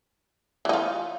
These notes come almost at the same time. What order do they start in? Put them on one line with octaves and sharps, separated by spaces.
E3 D#4 F4